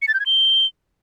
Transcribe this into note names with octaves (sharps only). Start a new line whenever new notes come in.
C#7
A6
G6
G#6
G7